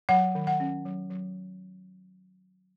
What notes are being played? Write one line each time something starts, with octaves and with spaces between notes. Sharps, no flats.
F#3 F#5
D#3
F#5
C#4
F#3
F#3